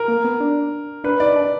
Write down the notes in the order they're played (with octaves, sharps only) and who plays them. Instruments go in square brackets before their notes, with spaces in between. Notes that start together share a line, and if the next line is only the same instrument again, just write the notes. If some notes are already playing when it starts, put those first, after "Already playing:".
Already playing: [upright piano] A#4
[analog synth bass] A#3
B3
D4
[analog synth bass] D4 [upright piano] B4
[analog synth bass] D#4 [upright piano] D5
[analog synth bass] D4